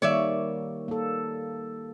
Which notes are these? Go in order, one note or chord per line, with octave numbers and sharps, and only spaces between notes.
D#3 G3 A#3 C#5 D5 E5
A#3 A4